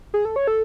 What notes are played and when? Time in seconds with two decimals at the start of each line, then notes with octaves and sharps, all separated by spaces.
0.14 G#4
0.25 A4
0.36 C#5
0.48 A4